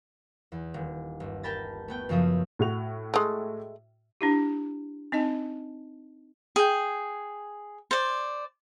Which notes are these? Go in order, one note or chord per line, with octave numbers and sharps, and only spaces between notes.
E2
D#1
G1
A#4 G5 A5 B5 A6
A3 B3 G5
F#2 C#3 F3 E5 D#6
A2 F#4 F7
G#3 A3
D4 E4 G4
C4 D#4 D#5 A5
G#4 G5
C5 D5